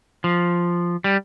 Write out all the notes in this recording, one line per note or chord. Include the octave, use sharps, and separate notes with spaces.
F3
G3